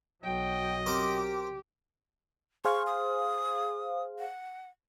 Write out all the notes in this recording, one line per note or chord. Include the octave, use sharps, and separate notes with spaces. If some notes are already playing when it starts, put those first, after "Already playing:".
B1 F#3 D#5 G5
C4 G4 A#4 D6
G#4 C5 F5 C#6
D#6
F#5